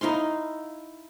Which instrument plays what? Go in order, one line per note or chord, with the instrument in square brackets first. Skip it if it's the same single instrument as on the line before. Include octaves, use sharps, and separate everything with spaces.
[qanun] D#4 E4 F5 C6